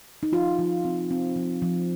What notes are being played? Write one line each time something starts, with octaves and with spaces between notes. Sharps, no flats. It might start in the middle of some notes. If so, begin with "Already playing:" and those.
D#4
F3 F4
F3
C4
C4
F3
F3